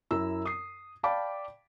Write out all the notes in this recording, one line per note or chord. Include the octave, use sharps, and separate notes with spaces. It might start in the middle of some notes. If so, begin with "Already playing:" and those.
F#2 E4 A#5 E6
D#6 C7
D5 F5 G5 A5 B5 D6